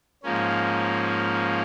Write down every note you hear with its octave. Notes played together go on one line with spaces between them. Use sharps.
G#2 F3 A#3 C#4